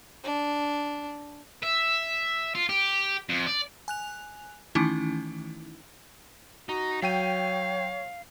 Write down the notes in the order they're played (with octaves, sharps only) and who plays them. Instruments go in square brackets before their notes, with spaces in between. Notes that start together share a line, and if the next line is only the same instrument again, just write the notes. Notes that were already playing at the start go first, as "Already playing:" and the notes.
[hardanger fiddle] D4
[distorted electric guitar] E5
F4
G4
F2
D5
[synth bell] G#5 F#6 F7
D#3 E3 A3 C#4 D#4 E4
[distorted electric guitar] D#4 [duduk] F#4
[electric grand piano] F#3 G5 D#7 [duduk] C#5 [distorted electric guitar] F5